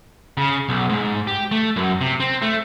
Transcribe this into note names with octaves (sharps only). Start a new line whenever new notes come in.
C#3
B1
G#2
G4
A3
F#2
C3
C4
A3